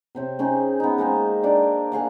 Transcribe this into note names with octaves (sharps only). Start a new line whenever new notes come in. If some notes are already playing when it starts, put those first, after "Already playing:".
C3 C4 C#5
C4 C#4 D#4 G#4
B3 D#4
G#3 A#3 C4
D4 A#4 C5 D5
A#3 G#4 F5 F#5